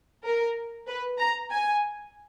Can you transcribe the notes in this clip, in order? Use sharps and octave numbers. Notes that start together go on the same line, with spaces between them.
A#4
B4
A#5
G#5